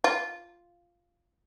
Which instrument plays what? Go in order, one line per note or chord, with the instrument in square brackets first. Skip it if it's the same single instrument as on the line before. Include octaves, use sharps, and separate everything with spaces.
[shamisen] F4